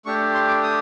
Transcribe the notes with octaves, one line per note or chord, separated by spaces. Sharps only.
A3 D4 G4 C#6
C6
D6
D#6